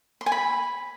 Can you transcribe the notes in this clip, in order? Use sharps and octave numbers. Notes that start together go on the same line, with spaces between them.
C6
G#5
B5